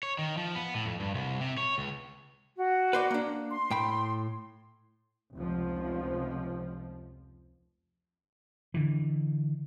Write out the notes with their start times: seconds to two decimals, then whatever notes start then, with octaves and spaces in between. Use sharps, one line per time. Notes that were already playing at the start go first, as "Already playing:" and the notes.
0.03 C#5
0.19 D#3
0.37 F3
0.55 B3
0.74 A2
0.86 F2
1.00 G2
1.14 C2
1.40 C3
1.58 C#5
1.78 C#2
2.57 F#4
2.93 B4 C5 D5
3.11 A#3 D4
3.50 C6
3.71 A2 G5 B5
5.34 F1 C#2 F3
8.74 D3 E3